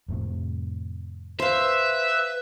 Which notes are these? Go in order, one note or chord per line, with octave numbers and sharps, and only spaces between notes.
F2 A2 C3
B4 C5 E5 F5